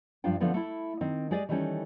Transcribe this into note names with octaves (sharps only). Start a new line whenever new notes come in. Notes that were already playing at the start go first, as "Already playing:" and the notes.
G2 F3 D4 F4 G5
D3 F3 A3 B3 C4
A3 E4
D#3 C4
G#3 G4 G#4 D5 D#5
D#3 E3 G3 A3 C#4